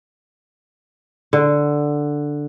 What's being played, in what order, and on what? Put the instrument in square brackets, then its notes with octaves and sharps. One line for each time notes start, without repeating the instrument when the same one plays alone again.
[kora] D3